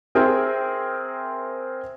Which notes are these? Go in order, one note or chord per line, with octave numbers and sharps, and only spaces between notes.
C4 G#4 A#4 C5 E5 G5